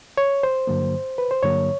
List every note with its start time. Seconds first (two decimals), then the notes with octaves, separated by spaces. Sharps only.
0.17 C#5
0.43 C5
0.67 G2 D3 F#3 A#3
1.18 B4
1.31 C5
1.42 G2 D3 F#3 A#3 C#5